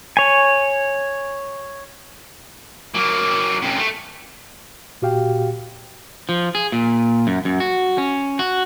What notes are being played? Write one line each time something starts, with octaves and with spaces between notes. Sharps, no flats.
C#5 G#5
F#3 A#3
F#2 C3
A3
A#2 F#4 G4 F5 G5
F3
G#4
A#2
F#2
F#2
F#4
C#4
F#4